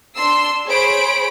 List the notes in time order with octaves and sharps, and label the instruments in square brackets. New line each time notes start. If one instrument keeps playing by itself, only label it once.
[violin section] D4 C6 E6 C7
G#4 C5 C#5 B5 D7